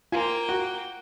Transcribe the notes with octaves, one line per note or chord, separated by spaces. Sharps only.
A#3 F4 G5 G#5
F#4